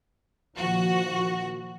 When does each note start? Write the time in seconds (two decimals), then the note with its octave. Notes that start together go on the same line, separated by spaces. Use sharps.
0.57 A#2 D#3 F3 F#4